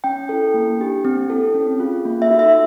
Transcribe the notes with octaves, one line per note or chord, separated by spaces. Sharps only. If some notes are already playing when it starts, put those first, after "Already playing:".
C#4 G5
E4 A4
A#3
D4 G4
C4
E4 A4
C#4
F4 G#4
A#3
E5
D#4 F#4 A4
E5